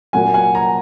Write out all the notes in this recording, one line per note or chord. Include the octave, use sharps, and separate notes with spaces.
A#2 F#3 A#3 F#5 G#5
F#5 G#5
G#5 A#5